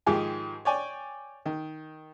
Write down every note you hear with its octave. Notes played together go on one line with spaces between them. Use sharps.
G#2 D#3 F3 G4 G#4 G#5
C#5 D5 G5 G#5
D#3